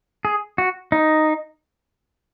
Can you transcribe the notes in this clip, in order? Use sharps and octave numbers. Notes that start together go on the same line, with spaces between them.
G#4
F#4
D#4